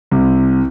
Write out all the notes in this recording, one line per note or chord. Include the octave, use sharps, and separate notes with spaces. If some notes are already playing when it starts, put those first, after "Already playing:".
C2 C3